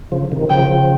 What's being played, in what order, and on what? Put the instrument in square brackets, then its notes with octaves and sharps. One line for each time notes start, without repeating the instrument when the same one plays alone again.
[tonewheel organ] C#3 F3
C3 D#3
[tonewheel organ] C#3 F3 [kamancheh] G5